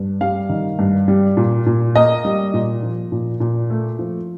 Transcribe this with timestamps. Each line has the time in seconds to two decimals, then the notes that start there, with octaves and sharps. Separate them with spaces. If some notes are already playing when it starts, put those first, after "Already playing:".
Already playing: G2
0.21 G3 F5
0.49 D#3
0.79 G2
1.08 G3
1.37 A#2
1.66 A#2
1.95 A#3 D#5
2.25 G3
2.54 A#2
2.83 F3
3.12 A#2
3.40 A#2
3.70 A3
3.99 F3